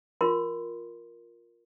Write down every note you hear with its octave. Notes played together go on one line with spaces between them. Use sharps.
F4 A#4 C6